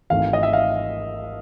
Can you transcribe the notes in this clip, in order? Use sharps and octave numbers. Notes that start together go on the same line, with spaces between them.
G#1 G#2 E3 A3 F5
D#5
E5
F5